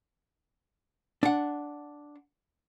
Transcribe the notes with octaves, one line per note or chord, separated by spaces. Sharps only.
D4 F#5